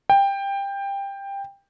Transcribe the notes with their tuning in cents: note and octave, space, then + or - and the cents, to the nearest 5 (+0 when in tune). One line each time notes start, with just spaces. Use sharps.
G5 +15